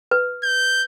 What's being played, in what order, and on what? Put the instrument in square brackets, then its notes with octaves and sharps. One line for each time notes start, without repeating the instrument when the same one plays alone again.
[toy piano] B4
[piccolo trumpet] G6